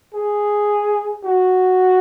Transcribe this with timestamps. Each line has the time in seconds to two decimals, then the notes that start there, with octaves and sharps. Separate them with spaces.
0.14 G#4
1.24 F#4